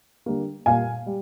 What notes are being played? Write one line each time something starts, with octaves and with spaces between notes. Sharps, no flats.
D3 G3 A#3
A#2 G3 A#3 F5 G#5
G3